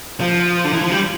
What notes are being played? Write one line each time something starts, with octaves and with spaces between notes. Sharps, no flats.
F3
D3
E3
F3
G3